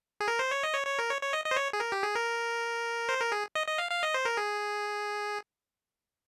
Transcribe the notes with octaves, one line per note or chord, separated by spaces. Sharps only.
G#4
A#4
C5
C#5
D#5
C#5
C#5
A#4
C#5
C#5
D#5
D#5
C5
C#5
G#4
A#4
G4
G#4
A#4
C5
A#4
G#4
D#5
D#5
F5
F5
D#5
C5
A#4
G#4